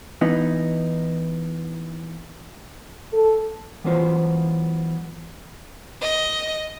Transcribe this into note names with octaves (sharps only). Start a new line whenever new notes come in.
E3 B3 D#4
A4
E3 F#3 B3 C#4 F4 C5
D#5